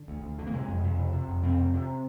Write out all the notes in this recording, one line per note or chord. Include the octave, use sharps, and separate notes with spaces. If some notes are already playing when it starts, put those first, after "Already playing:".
Already playing: D3
D2
D2
D3
A#3
C3 G#3
F2
F2
C3
C3
F2
F2 C4
C3
C3